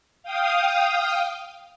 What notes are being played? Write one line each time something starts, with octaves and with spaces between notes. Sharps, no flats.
F5 G5 D#6